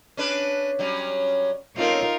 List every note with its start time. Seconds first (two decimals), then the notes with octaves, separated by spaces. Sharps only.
0.17 C#4 D4 B4
0.79 F#3 G3 C#4
1.76 A3 C4 C#4 D#4 F4 A#4